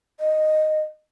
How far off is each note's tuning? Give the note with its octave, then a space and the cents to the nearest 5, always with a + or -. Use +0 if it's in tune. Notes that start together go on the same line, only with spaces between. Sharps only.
D#5 -5